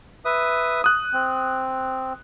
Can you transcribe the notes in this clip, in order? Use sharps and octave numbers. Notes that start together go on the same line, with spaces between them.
B4 E5 D#6
D#6 F#6
C4